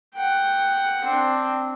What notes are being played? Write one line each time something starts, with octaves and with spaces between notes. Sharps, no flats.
F#5 G5
C4 D4